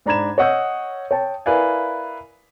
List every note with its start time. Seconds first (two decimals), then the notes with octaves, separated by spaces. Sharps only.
0.06 G#2 D4 A#5 B5 G#6 E7
0.38 C#5 D#5 F#5 D#6 E6 G6
1.11 C#5 G5 A5
1.46 E4 A#4 B4 D5 F5 G#5